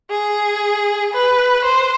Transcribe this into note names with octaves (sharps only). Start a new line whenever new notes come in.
G#4
B4
C5